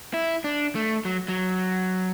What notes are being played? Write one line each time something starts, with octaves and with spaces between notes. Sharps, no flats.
E4
D4
A3
F#3
F#3